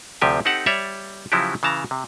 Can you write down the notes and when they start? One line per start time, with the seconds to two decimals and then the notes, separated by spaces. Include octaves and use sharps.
0.21 D2 C3 F3 G4 G#5
0.45 C4 D#4 G4 A4 F#5 A5
0.66 G3 C#5 D5 E5
1.32 C#3 F3 F#3 E4 F#4 G4
1.63 C#3 E3 A5 A#5
1.91 C3